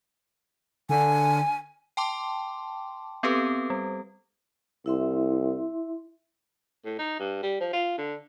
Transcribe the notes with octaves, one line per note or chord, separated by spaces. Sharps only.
D3 G#5
G5 A5 C6 D6
B3 C4 G4 A4 B4
G3
C2 E4 E5 C6
A2
D#4
G2
G3
F3
F4
D3